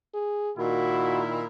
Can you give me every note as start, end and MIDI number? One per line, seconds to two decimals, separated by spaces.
0.14 0.52 68
0.58 1.43 46
0.58 1.43 51
0.58 1.43 64
0.58 1.21 66